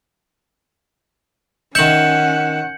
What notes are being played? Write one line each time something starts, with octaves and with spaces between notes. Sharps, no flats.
D#3 C#4 E5 F#5 G6 C#7 F#7